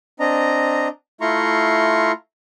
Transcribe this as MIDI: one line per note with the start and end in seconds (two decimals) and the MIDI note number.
0.20 0.88 60
0.20 0.88 62
0.20 0.88 75
0.20 0.88 82
1.21 2.12 57
1.21 2.12 64
1.21 2.12 65
1.21 2.12 82
1.21 2.12 84
1.21 2.12 85